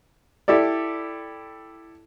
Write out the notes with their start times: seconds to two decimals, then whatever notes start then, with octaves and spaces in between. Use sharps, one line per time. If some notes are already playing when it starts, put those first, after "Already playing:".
0.48 E4 G4 A4 D5